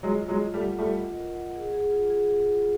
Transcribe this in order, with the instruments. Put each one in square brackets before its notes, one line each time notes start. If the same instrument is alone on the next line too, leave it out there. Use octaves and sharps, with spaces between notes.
[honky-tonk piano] F#3 G#3 [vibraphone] F4
[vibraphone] F4
[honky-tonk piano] F#3 G#3
[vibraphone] F4
[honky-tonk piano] G3 A3
[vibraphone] F#5
[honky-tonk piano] G3 A3 [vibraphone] F4
[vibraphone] D#5
A#4
F#5
G#4
G#4
F4
G#4
G#4
F4